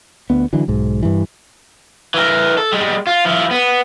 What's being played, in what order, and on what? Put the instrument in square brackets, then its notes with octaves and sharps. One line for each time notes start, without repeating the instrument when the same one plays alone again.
[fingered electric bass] D2 B3
D3 E3 F#3
B1 G#2
G2 E3
[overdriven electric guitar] E3 A#4
A4
G3 G#3
F4
F3 E4
B3